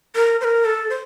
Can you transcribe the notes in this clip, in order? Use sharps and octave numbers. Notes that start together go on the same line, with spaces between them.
A#4
C5
A#4
A4
C5